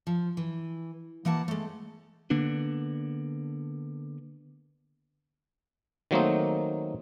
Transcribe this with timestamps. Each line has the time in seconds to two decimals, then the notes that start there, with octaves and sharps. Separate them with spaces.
0.07 F3
0.37 E3
1.25 E3 A#3 F#5 A5
1.48 G#3 A3
2.30 D3 A#3 B3 D4
6.11 D#3 F#3 A3 A#3 C4 D#4